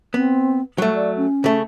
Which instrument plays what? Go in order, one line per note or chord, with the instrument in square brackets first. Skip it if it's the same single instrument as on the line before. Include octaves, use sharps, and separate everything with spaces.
[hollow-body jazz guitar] B3 [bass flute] C4
[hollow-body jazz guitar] F#3 A3 [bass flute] G3
[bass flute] D5
C#4
[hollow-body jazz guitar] C#3 A3